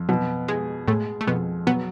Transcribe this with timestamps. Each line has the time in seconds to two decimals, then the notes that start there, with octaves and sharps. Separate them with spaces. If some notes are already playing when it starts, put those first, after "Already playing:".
Already playing: F2
0.09 B2 F#3
0.48 G#3 G#4
0.88 A2 G#3 A3
1.21 A3
1.27 F2 B2 B3
1.67 B2 F#3 B3